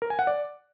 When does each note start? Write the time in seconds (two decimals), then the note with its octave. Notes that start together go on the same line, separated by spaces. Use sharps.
0.02 A#4
0.10 G#5
0.19 F#5
0.27 D5